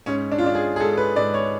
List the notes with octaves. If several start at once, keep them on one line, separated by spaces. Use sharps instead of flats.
G#2 C#4
D4
F4
G#2 D4
G#4
G#4
G#2 A4
B4
G#2 D5
C#5